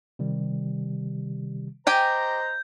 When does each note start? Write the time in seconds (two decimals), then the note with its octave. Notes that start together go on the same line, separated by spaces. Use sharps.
0.19 C3 D#3 G3
1.87 G4 C5 D#5 G5 G#5 A#5 G6